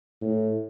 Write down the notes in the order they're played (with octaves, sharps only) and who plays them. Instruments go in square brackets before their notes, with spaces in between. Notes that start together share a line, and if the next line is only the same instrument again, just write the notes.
[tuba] A2